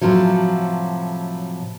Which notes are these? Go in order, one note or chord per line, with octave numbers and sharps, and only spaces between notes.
A2 C3 F3 F#3